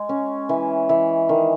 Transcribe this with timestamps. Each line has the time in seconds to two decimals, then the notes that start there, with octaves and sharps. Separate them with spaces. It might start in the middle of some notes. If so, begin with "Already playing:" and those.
Already playing: G#3
0.09 C#4
0.49 E3
0.89 E3
1.29 D#3